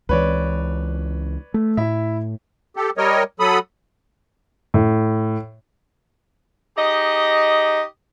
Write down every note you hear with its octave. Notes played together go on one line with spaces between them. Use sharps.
C#2 E3 B4 C#5 D5
A3
A2 E4 E5
G4 A4
G3 A#4 C#5 D#5
F#3 A4 B5 D#6
A2
D#4 G4 G#4 D#5